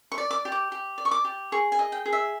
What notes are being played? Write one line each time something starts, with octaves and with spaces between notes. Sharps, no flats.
C#6
D5
D6
G4
D6
G4
D5
C#6
D6
G4
G#4 C#6
G#5
D#5
G5
G#4
E5